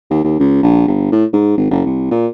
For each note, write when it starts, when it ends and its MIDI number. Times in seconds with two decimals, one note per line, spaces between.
0.10 0.22 39
0.24 0.37 39
0.39 0.58 37
0.63 0.84 34
0.88 1.08 31
1.12 1.25 45
1.33 1.54 44
1.57 1.69 32
1.70 1.81 30
1.86 2.08 36
2.11 2.27 46